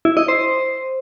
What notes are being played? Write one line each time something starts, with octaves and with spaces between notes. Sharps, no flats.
E4
D#5
C5